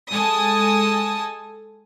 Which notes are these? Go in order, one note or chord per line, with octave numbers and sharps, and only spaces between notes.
G#3 A4 G#5 A5 D#6